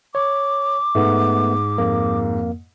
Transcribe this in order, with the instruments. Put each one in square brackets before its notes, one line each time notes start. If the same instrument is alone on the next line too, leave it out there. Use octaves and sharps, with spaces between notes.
[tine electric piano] C#5 [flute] D6
[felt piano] G#2 [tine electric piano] A3 B3
[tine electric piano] F2 A#3